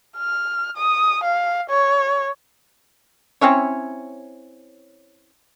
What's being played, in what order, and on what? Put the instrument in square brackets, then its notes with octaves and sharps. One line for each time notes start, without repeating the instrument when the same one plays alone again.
[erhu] F6
D#6
F5
C#5
[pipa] C4 C#4 E4 C#5